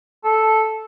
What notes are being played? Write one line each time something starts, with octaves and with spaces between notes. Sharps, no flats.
A4